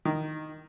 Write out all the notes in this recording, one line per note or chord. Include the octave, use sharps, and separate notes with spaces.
D#3